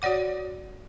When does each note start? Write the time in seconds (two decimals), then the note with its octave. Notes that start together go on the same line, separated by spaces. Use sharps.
0.02 F#4 C#5 D5 F#5 D6